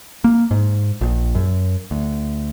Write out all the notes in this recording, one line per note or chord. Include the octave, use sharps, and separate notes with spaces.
A#3
G#2
A#1
F#2
D2